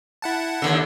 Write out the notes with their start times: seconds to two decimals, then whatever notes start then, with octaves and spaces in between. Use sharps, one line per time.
0.22 E4 F#5 A5
0.62 D#2 D3